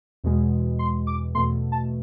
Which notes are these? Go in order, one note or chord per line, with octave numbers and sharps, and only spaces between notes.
E2 B2 G#3
C6
D6
E2 B2 A3 C6
A5